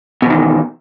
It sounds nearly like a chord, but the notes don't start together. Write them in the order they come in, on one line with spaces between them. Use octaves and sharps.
B2 E2 D#3